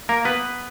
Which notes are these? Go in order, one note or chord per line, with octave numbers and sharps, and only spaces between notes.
A#3 A#4
B3 B4